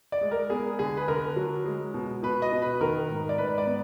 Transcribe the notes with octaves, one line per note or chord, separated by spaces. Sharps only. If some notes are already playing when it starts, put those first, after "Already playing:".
D5
G#3
A#4
B3 G#4
D3 G#4
B4
D3 A#4
F#3
G#3
B2
B2 B4
D#5
B2
B4
D#3 A#4
G#2
D5
G#2 B4
D5
B3